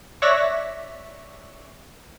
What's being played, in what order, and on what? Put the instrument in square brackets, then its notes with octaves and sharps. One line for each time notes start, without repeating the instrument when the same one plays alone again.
[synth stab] C#5 D5 E5 F#6 A#6 B6